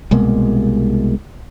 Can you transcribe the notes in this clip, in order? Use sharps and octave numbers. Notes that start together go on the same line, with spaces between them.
C2 B2 G#3 A#3